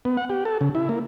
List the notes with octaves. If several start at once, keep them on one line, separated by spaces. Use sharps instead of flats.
B3
F#5
G4
A4
C#3
E4
A#3